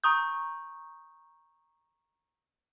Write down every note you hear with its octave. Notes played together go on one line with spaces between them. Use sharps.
A#5 C#6 D#6 G6